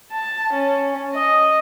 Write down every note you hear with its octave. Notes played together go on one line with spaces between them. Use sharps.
A5
C#4
D#5